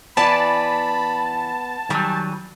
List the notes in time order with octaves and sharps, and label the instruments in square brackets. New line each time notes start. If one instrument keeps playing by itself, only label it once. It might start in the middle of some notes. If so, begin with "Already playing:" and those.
[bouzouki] E3 B4 D5 [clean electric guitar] B3 [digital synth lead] A5 [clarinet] B5
[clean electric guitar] D#3 F#3 [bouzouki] G3 G#5